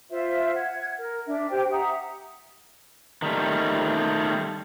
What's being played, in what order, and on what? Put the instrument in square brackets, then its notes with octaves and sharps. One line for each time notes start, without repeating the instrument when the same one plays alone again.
[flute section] F4 C5 E5
F#5 G#6
A#4
D4 E5
G4 C5 G5
E5 F#5 A#5 D#6
[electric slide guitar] D#3 G3 A3